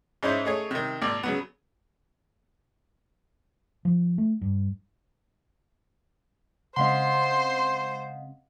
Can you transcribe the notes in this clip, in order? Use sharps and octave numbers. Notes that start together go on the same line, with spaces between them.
G#2 C#4 D#4 E4 C5
A3 D#4 G#4 C#5
C3 D#3
G#1 A#2 D5
C#3 F#3 B3
F3
A3
G2
C#3 G#3 C4 C5 D#5 F5 F#5 C6